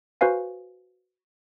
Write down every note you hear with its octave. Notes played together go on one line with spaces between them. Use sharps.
F#4 B4 C5 F5 G#5